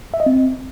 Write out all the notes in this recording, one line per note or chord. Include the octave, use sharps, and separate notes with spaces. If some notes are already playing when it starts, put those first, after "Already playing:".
E5
D#5
C4